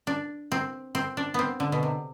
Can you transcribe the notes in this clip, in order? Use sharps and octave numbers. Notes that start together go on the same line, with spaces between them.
D4
C4
C4
D4
B3 C4
D3
B2
C3